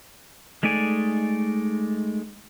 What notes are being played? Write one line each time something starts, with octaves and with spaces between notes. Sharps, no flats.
G#3 A3 D#4 D5 G#5